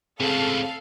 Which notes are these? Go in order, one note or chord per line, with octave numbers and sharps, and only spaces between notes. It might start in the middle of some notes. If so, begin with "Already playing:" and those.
C#2 A2 C4 G#4 A4 F5